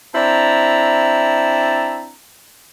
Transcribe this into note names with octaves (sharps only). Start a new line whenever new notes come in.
C4 D4 E4 A5 A#5